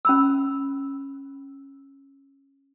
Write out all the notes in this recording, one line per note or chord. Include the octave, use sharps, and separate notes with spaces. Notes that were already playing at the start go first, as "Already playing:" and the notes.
C#4 B5 E6